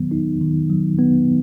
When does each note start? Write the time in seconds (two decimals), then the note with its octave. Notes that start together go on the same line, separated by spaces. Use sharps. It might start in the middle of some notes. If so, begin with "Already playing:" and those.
Already playing: D#3 F#3 B3
0.11 D#4
0.41 D#3
0.70 F#3
0.99 B3